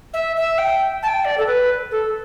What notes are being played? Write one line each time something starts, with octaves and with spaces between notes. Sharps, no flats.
E5
E5
G5
A5
G5
D5
A4
B4
A4